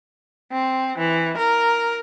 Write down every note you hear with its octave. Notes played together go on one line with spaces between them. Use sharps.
C4
E3
A#4